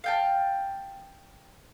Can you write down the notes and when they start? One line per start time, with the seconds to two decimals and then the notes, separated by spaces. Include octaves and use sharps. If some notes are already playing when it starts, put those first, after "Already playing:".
0.04 F5 G5 A5